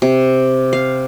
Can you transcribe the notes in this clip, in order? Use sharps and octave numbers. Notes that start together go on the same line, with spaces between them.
C3
F5